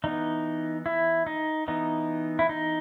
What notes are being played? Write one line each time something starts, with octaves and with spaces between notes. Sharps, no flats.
E3 B3 D#4
E4
D#4
E3 B3 D#4
E4
D#4